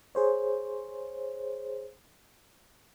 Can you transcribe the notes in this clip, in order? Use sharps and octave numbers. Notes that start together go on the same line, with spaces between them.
G#4 C5 C#5